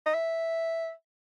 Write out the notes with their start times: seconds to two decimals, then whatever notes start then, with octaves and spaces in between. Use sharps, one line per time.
0.06 D#5
0.14 E5